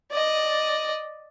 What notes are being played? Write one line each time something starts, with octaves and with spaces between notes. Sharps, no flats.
D5 D#5